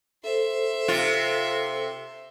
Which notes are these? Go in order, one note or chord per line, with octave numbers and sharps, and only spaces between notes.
A4 C5 E5 C6
C3 F4